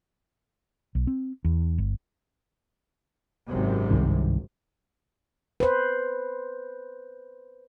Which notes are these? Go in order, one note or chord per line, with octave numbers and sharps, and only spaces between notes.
B1
C4
E2
G1
G#1 F#2 C3
C2 G2 D#3
B4 C5